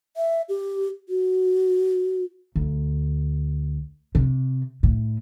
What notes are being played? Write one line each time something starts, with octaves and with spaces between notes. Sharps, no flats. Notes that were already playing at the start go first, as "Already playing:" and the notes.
E5
G4
F#4
D2
C3
A2